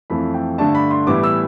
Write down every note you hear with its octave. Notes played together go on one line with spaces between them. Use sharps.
F2 E3 A3 B5
G5
G2 D3 A3 D4 A5
B5
C6
A2 E3 G3 B3 E4 D6
E6